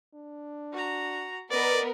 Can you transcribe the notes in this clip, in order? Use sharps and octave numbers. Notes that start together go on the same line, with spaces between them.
D4
F#4 A#5
B3 A#4 B4 D5 D#5